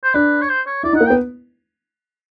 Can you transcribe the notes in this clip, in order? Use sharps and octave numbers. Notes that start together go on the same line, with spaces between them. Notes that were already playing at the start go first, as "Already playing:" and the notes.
C5
D4 B4
C#5
C5
C#5
E4 D5
D#4
F#5
A#3
G5
B3